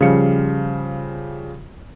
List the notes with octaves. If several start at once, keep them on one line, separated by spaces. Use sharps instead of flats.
C#3 F3 G3 F5 C#7